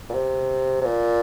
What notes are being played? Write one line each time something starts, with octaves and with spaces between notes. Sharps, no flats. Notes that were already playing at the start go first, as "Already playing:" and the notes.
A#2
C3
C3
A#2